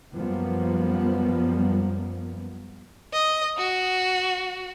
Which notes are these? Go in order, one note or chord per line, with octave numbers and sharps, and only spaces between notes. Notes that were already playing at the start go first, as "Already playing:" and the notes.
F#2 F3 G3 A#3 B3
D#5
F#4